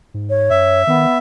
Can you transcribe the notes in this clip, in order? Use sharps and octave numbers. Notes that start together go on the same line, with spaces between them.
G#2
C#5
F#2 E5
D#3 B3